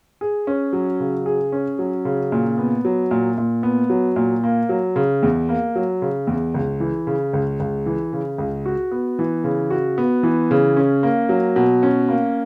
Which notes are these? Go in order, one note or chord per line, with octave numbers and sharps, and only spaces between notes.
G#4
C#4
F#3
C#3
G#4
C#4
F#3
C#3
A#2
B3
F#3
A#2
A#2
B3
F#3
A#2
A#3
F#3
C#3
E2
A#3
F#3
C#3
E2
C#2
E3
C#3
C#2
C#2
E3
C#3
C#2
F#4
B3
E3
C#3
F#4
B3
E3
C#3
C#4
A#3
F#3
B2
C#4
A#3